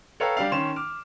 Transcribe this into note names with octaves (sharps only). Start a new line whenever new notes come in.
A4 B4 C#5 F5 G5 A#5
G3 D4 F5
D#3 C#4 C6 E7
D6 F6